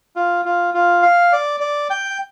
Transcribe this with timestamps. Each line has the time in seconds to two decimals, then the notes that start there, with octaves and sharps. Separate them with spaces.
0.16 F4
0.45 F4
0.74 F4
1.03 F5
1.32 D5
1.60 D5
1.90 G5